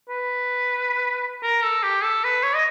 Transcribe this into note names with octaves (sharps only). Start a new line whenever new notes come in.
B4
A#4
A4
G4
A4
B4
C#5
D#5